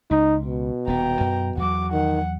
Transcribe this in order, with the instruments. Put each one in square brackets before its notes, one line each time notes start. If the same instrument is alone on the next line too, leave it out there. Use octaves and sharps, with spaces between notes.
[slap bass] C#2 [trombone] D#4
[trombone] B2
[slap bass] D#1 B3 [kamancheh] G5 A#5
[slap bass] F#2
[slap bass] E2 F#3 [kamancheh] F#4 D6
[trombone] D#3 [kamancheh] F#5